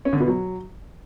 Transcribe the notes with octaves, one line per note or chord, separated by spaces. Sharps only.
C#4
D3
B2
F#3